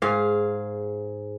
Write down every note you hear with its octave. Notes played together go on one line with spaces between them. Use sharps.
G#2 G#4 F5